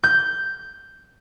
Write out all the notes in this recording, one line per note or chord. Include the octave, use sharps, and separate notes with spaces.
G6